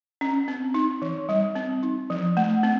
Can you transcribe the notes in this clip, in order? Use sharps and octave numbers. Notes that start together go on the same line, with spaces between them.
C#4
C4
D#4
E3
G3
C4
D#4
F3
A3
C4